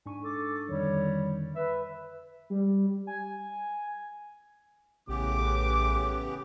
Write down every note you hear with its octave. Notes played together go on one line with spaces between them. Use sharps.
G#2 D4 G#5 C#6
A4 D6
F2 D3 D#3 G3 C#5
B4 E5
G3
G#5
A#1 A2 C#3 E3 B3 G4 D6